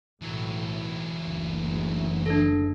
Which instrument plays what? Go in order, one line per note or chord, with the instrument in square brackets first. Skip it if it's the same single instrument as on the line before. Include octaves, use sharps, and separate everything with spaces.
[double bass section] B1 A2 [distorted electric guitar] E3 F#3
[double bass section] F#1 D2
[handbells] D4 A4